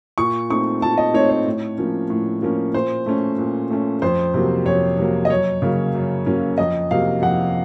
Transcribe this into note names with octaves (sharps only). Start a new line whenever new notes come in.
A#2 C#6
A3 C4 D#4 C#6
A#2 A5
D#5
A3 C4 D#4 C#5
C#5
A2
F3 A#3 C#4
A2
F3 A#3 C#4
A#2 C5
A3 C#4
A#2
A3 C#4
F2 C5
C3 F#3 A#3
F2 C#5
C3 F#3 A#3
D#5
F#2 C#5
C#3 F#3 A#3 C#4
F#2
C#3 F#3 A#3 C#4
F2 D#5
C3 F#3 A#3 F5
F2 F#5